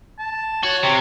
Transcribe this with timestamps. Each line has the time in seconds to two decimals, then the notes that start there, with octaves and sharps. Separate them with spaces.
0.19 A5
0.63 F#4 C#5
0.84 C3